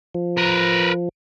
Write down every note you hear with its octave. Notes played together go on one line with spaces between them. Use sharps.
F3
A#4 B4